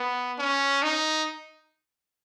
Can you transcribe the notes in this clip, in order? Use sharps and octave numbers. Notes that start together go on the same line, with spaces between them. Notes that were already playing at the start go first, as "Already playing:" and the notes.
Already playing: B3
C#4
D#4